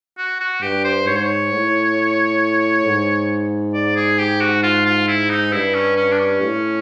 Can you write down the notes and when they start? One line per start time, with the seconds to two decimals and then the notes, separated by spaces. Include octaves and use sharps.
0.17 F#4
0.40 F#4
0.62 G2 G4
0.84 C5
1.07 G#2 C#5
1.15 C5
1.23 C#5
1.52 A2
2.85 G#2
3.74 D5
3.96 G#4
4.18 G4
4.41 F#4
4.63 F4
4.86 F4
5.07 E4
5.30 D#4
5.52 G2 E4
5.74 C#4
5.97 C#4
6.12 D4
6.19 C#4
6.41 A2